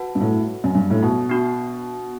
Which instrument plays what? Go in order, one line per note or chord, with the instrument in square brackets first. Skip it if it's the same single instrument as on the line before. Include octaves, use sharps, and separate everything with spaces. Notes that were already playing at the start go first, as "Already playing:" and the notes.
Already playing: [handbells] F#4 B4 F#5 A5
[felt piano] G2
A2
F#2
G2
A2
B2
[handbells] B3 D4 F#4